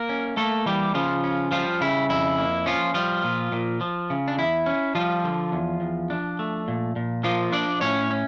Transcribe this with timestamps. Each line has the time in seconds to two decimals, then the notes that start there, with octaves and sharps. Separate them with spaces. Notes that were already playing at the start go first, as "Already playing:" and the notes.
Already playing: A#3 A#4
0.09 C#4
0.37 A3 A#3 A4
0.66 E3 G3 G4
0.95 C#3 F3 F4
1.24 C#4
1.51 F3 G3 F4
1.81 C#3 E4
2.10 F2 E4
2.38 A#3
2.66 F3 C#4 F4
2.94 F3 G3 F4
3.24 A#2
3.52 A#2
3.81 F3
4.10 C#3
4.28 D4
4.38 E2 E4
4.66 C#4
4.95 F3 G3 F4
5.24 D3
5.52 E2
5.81 E2
6.10 D4
6.39 A3
6.68 A#2
6.96 A#2
7.24 F3 A#3 F4
7.52 F3 D4 D5
7.81 A2 C#4 C#5
8.11 C#4